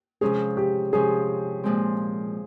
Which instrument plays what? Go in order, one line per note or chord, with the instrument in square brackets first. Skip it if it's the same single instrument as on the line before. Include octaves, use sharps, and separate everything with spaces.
[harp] C3 F3 G#3 C#4 [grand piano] G#4
[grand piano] G4
[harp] C3 F3 G#3 C#4 [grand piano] G#4
[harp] A#2 F3 G#3 C4